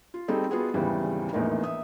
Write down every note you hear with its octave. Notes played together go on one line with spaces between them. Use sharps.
F4
G3 C4 D#4 G#4 A4
B3 F4 F#4 G#4
G#1 E2 C#3 E3 G3
A#1 E2 A2 A#3 D#4
E5 D#6